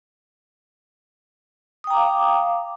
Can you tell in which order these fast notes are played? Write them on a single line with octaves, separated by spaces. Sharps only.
D#6 G5 A#5 D6 F5